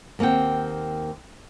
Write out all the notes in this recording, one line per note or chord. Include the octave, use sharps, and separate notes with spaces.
D#2 A#3 C4 F#5 G5